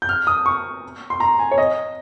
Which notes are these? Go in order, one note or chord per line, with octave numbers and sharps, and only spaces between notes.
G6
F6
D#6
C#6
C6
A#5
G#5
C#5
D#5